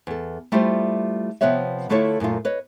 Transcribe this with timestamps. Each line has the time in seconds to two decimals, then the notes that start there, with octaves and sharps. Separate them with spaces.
0.07 E2 A4
0.52 G3 A3 E4 F4 G4 C5
1.41 C3 F3 B3 B4 C#5 E5
1.89 D3 A3 E4 F4 A4 C#5
2.20 F#2 A#2 A3 F4
2.45 B4 C#5 D#5